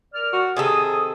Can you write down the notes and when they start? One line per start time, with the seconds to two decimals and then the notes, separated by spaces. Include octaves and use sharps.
0.14 A#4 D5 F6
0.33 F#4
0.57 C3 D#3 G#4 A4 D#6